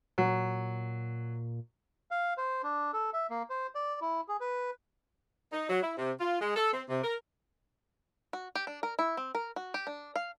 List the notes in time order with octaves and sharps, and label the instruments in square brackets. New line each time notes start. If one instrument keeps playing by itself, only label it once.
[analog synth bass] A#2 [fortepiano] F#3
[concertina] F5
C5
D4
A4
E5
A#3
C5
D5
E4
G#4
B4
[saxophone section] D#4
F#3
E4
C3
F4
G#3
A4
C4
C3
A#4
[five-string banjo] F#4
G4
D4
A#4
E4
C4
A#4
F#4
G4
D4
F5